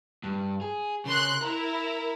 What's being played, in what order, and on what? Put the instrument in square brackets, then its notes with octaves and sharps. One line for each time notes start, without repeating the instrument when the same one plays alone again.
[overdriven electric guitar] G2
G#4
[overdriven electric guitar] C#3 [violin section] A#4 C6 F#6
[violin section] E4 A#4 [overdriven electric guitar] A#5